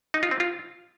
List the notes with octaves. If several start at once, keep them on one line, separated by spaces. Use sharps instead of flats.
D#4
F4
C4
F4